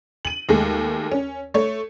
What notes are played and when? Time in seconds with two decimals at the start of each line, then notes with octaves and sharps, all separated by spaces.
0.25 D#7 F#7
0.49 D#2 G#3 A3
1.12 C#4
1.54 A3 C#5